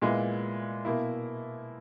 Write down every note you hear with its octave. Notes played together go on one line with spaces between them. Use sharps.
A#2 G#3 B3 E4
B2 A#3 E4